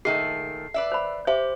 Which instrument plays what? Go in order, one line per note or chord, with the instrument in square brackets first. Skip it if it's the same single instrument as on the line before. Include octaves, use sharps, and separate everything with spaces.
[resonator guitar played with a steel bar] A#2 D#3 A3 [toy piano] G#4 [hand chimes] C7
[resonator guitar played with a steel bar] B4 D5 E5
[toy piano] C5 B5
[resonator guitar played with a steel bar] G4 [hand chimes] C5 [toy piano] E5